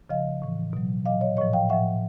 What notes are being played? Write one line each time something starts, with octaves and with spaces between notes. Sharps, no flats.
C#3 F3 D#5 F5
A2 E3
B2 F#3
A#2 F#3 D#5 F5
C#5 D#5
A2 F3 C#5 D#5
F5 G5
A2 F3 E5 F#5